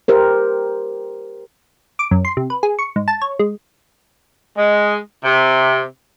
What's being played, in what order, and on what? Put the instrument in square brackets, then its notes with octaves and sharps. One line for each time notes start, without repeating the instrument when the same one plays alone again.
[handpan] G4 A#4 C5
[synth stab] D6
F#2
C6
C3
B4
G#4
C#6
G#2
A5
C#5
G#3
[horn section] G#3
C3